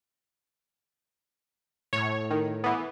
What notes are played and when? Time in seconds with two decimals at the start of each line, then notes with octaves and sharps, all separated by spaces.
1.93 A2 C#5
2.31 D#3
2.64 E3 B3